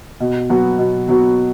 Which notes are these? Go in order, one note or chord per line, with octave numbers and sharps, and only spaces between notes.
B2
F#3 B3 F#4
B2
F#3 B3 F#4